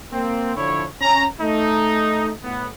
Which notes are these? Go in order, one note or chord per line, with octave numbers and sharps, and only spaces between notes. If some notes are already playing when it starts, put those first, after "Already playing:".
A#3 C4
D3 F3 E4 C#5
C#4 A#5
A3 D#4
A2 B3